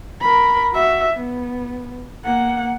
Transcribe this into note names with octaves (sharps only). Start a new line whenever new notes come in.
A#4 B5
F#4 E5
B3
A#3 F#5